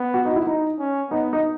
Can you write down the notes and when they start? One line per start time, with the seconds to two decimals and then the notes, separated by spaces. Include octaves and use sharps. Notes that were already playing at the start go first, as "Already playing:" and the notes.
Already playing: B3
0.14 F#4
0.25 D#4
0.30 F#4
0.36 E4
0.47 D#4
0.79 C#4
1.10 B3 D#4
1.33 D#4